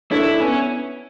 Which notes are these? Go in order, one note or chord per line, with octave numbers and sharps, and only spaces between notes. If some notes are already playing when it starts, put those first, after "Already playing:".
D4 E4 A4 C#5 E5
B3 C#4